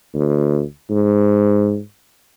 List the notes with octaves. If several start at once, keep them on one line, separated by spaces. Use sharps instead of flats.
D2
G#2